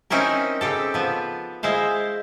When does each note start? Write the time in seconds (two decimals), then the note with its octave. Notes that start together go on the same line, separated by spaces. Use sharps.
0.10 C4 C#4 D#4 E4 A#4
0.61 C#3 C4 G4 A4
0.94 F3 B3
1.63 G#3 E4 C5 F5